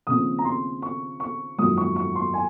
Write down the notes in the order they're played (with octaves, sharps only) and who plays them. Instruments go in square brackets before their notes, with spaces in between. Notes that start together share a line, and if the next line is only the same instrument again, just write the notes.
[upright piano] D#2 C#3 F3 C4 D#6
A#5
C6
C#6
C#6
G#1 F#2 F3 A#3 D#6
C#6
C#6
C6
G#5